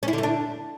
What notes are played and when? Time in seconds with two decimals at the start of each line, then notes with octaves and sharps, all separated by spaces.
0.03 C#4
0.08 E4
0.13 D3
0.18 A3
0.23 D4